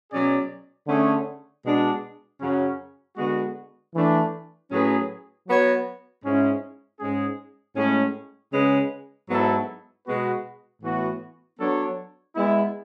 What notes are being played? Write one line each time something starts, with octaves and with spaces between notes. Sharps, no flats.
B2 F#3 C#4 G#4 D5
D3 A3 C#4 G#4 C#5
B2 G#3 D4
F#2 C#3 F#3 C#4
D3 G#3 B3 F#4
E3 A3 D4
A2 F#3 C#4 G#4 B4
F#3 B3 F#4 C#5
G#2 G#3 C#4 E4
G#2 G#3 C#4 G#4
A2 G#3 C#4
C#3 G#3 C#4 G#4 B4
G#2 F#3 B3 E4 A4
B2 G#3 B3 F#4 B4
A2 E3 B3 F#4
F#3 B3 D4 A4 C#5
G#3 B3 E4